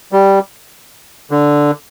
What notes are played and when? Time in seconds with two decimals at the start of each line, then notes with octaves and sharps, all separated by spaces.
0.12 G3
1.31 D3